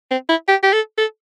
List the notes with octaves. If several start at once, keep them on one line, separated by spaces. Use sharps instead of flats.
C4
E4
G4
G4
A4
A4